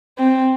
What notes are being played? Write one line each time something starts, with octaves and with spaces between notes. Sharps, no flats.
C4